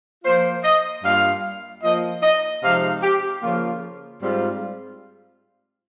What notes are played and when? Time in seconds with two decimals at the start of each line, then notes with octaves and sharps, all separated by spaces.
0.24 F3 A#3 F4 C5
0.64 D#5
1.04 G2 G3 A#3 F4 F5
1.83 F3 A#3 F4 D#5
2.23 D#5
2.63 C3 F3 G#3 D#4 F5
3.03 G4
3.42 C#3 F3 A#3 F4
4.22 G#2 G3 C4 F4